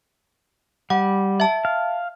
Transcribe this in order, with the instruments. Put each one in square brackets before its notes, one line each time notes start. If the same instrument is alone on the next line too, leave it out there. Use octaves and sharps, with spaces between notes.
[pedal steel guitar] G3 [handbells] F#5
[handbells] E5 A5
[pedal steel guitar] F5